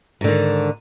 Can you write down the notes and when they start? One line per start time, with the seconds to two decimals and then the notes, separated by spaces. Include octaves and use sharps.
0.21 G#2
0.24 D3
0.27 D#3